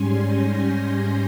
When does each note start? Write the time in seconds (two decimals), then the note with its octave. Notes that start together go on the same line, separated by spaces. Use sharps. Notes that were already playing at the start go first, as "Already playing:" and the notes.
Already playing: G#2 G3 C#4 G#5 C6
0.22 G6 A#6